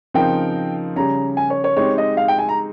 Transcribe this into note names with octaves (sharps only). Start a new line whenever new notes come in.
C#3 F3 C4 D#4 A#4 G5
C#3 G3 C#4 A#5
G#5
C#5
C#5
G#3 C4 D#4 G4 C#5
D#5
F5
G5
G#5
A#5